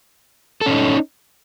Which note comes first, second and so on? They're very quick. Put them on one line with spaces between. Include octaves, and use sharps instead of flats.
A4 C#4 D#4